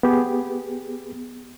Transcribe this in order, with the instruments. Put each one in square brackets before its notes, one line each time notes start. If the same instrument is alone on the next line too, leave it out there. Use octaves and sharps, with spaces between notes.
[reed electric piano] B3 G4 G#4